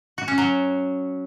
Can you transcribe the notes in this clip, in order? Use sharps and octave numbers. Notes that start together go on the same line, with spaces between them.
F#4
C#4
F#3